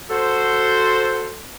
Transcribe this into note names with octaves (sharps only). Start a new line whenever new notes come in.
F#4 A4 C5